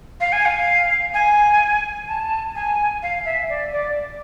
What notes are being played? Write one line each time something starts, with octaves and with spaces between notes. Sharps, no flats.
F5
G#5
F5
G#5
A5
G#5
F5
E5
D5
D5